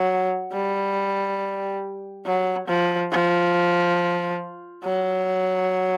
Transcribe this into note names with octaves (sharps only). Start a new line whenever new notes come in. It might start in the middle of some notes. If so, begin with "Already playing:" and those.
Already playing: F#3
G3
F#3
F3
F3
F#3